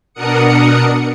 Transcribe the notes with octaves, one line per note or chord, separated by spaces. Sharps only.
B2 D4 A#4 F#5 D#6 C#7